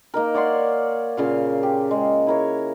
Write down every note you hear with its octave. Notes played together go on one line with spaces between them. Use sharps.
A#3 D#4 A#4
C#5 D5 F#5 C6
A#2 C#3 F5
G4
G#3
E4 A#4 C#5